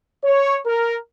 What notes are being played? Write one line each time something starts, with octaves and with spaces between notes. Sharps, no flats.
C#5
A#4